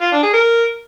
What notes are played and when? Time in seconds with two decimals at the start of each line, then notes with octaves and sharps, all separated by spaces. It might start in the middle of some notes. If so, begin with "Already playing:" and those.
0.02 F4
0.12 D4
0.23 G#4
0.33 A#4